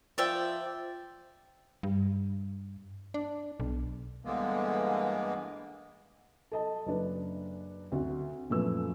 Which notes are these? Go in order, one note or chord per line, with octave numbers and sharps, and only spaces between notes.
F3 D5 E5 G5
G2
D4
B1
G2 D3 E3 G#3 A#3 B3
A4 D#5 A5
F#1 D4 B4
D2 C4 F#4
F#2 A#2 F3 A3 B4 E6